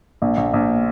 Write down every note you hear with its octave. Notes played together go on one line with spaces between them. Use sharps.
A#1
A#1
A#1